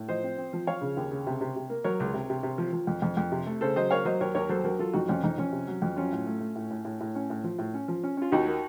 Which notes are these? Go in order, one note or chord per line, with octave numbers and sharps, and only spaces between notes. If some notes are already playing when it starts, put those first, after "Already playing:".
Already playing: A2
F3 C5 D#5
C4
C4
F3
F3 C#5 F5
C#3
D#2
C#3
C3
C3
C3
A#3
F#3 A#4 C#5
C#2
C3
C3
C3
F3
F3
F2
F2
F2
C3
A3
C#3 A4 C5
F#3 C5 D#5
A#3 C#5 F5
F#3 C5 D#5
D#2 A#4 C#5
D#2 A#4 C#5
F#3 A4 C5
F#3 F#4 A#4
F#3 F4 A4
F2 D#4 F#4
F2 C#4 F4
F2 D#4
F2 C#4
C3
F#3
F2
F#3 C#4 F4
A2
A3
A3
A2
A2
A2
A2
C#4
A2
F3
A2
C#4
F3
C#4
C#4 F4
D#2 D#4 F#4
A#3